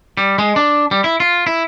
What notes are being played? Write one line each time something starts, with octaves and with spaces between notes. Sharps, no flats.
G3
G#3
D4
G3
E4
F4
E4